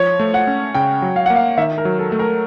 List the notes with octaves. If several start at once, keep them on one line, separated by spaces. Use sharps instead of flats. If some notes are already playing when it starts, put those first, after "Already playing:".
Already playing: F3 C#5
A3
F#5
C#4
C#3 G5
F#3
F5
A#3 F#5
F5
D#3 E5
A#4
F#3
A4
A3
A#4